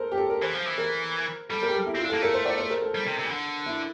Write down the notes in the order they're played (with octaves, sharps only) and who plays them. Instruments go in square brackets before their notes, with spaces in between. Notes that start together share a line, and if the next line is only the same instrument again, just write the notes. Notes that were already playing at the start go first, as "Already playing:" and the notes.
Already playing: [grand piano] A4 A#4 C5
G4
A4
A#4
[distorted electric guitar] E3 [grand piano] C5
[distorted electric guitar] F3
E3
[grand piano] A#4
[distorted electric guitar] G3 [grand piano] A4
[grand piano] A#4
G4
A4
E4
[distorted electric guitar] C4
[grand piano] F4
[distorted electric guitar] D4
[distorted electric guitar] A#3 [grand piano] A4
[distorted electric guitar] A3 [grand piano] A#4
[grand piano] C5
D5
C5
A#4
A4
[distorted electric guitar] G3
C3
C3
E3
D3
[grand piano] E4